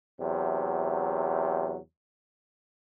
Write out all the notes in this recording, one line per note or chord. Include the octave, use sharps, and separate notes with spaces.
E2 C3 F#3